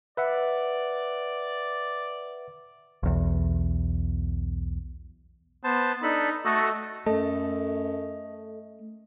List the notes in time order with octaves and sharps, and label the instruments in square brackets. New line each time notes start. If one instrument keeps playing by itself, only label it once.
[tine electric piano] B4 E5 F#5 [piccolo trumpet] D5
[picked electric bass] B1 E2
[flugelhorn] B3 [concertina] C5 A5
[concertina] D4 A4 B5 [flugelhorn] D#4
[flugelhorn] A3 [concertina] F#4 A4 D#5
[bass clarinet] F#2 [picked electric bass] A3 [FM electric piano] A4 [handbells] D#5